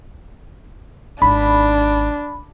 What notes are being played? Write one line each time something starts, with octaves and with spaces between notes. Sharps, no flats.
G#1 D4 F4 B5